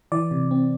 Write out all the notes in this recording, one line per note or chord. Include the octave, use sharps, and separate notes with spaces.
E3 D5
C3
C4